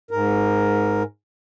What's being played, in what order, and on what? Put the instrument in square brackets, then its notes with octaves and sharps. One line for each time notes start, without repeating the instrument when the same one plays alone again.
[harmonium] G#2 A#4